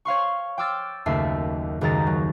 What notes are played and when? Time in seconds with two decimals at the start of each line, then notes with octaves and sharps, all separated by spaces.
0.05 C#5 F5 C6 C#6
0.58 G5 C6 D6 E6 F6 A6
1.06 F#1 D#2 A3 E5 C7
1.81 F#1 D#2 D#3 G#3 A#5 A6
2.07 F#3